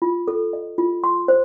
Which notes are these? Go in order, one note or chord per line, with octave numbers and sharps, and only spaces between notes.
F4
A4
D#5
F4
C6
C5